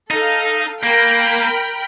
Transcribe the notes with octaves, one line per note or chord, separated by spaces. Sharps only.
D#4 A4 F5
A#3 A#4 G5 B5